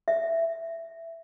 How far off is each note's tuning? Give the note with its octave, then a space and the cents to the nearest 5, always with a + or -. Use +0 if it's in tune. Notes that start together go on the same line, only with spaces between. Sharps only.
E5 +5